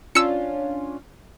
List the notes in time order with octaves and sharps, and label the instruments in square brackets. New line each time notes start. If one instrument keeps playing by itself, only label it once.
[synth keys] C#4 D4 F4 [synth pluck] E6 C#7